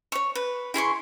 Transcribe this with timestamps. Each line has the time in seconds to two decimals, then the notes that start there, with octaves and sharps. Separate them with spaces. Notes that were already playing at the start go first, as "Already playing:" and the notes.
0.12 C#5 C#6
0.35 B4
0.74 E4 G#4 C6 C#6